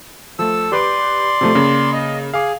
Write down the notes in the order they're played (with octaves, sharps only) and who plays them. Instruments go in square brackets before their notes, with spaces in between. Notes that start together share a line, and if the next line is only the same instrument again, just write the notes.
[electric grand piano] F3 A3 [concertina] A4 E6
[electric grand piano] G4 B4 D6 [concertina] D5 C6
[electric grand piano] C3 F3 A3
C#3 A#3
[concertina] D#5
[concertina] G#4 [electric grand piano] F5 D6